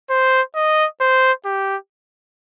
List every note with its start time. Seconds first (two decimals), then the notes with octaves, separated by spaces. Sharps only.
0.10 C5
0.56 D#5
1.01 C5
1.45 G4